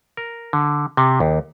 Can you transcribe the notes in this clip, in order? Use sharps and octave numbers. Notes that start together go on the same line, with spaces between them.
A#4
D3
C3
D#2